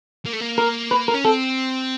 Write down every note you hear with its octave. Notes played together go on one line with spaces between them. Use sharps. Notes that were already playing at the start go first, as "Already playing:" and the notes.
A#3
A3
A#3
A#4
B4
A#4
C#4
C4 A4